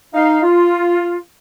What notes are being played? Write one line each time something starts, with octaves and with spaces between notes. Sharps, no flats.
D#4 F5
F4